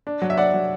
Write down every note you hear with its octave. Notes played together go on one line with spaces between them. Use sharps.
D4
F#3
E5
D4 D5 F#5
F#3